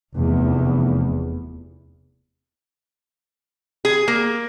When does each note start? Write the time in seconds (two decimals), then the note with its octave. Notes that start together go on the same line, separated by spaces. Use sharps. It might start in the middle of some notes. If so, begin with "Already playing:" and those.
0.14 F1 E2
3.85 G#4
4.08 A#3